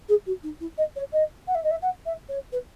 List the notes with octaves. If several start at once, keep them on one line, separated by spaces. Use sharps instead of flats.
G#4
F#4
D#4
E4
D#5
C#5
D#5
F#5
E5
D#5
E5
F#5
E5
C#5
B4